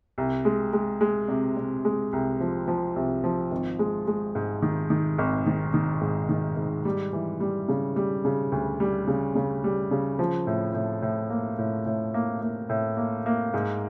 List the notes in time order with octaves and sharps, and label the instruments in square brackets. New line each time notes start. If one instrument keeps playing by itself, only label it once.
[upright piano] C2
G#3
G#3
G#3
C3
C3
G#3
C2
F3
F3
C2
F3
G#1
G#3
G#3
G#2
D#3
D#3
G#1
D#3
D#3
G#2
D#3
G#2
G3
E3
G3
C#3
G3
C#3
D2
G3
C#3
C#3
G3
C#3
F3
A2
A2
A2
A#3
A2
A2
A#3
A#3
A2
A#3
A#3
G#2